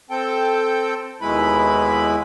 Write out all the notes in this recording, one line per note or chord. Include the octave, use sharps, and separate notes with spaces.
C4 A4 G5
D#2 B2 G#3 E4 B4 B5